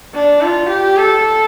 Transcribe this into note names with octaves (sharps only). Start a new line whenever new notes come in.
D4
F4
G4
A4